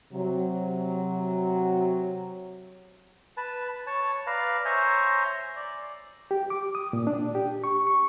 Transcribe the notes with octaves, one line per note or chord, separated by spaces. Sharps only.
C3 F#3
B4 A5
C#5 A5
B4 D5 F5 A#5
C5 C#5 E5 G#5 A#5 C6
D5
G4
D6
D#6
A#2
D4
G4
C#6
C#6